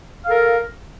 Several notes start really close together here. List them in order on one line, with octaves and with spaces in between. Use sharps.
F5 A4 A#4